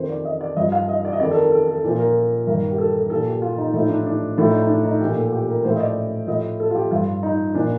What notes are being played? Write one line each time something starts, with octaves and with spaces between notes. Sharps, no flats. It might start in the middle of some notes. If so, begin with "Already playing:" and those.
Already playing: F2 D#3 C5
D5
D#5
D5
G2 F3 D#5
F5
D#5
D5
D#5
F2 D#3 D5
A4
A#4
A4
A4
A#2 F3
A#4
G2 D#3 A#4
G4
A4
A4
A#2 F3 A4
G4
F4
D#4
A2 F3 D#4
D4
D4
A2 F3 D4
D#4
D#4
D4
D#4
A#2 F3 G4
A4
G4
A#4
A2 F3 C5
D#5
D5
A2 F3 D#5
A4
F4
G4
G2 F3 F4
D#4
A#2 F3 D4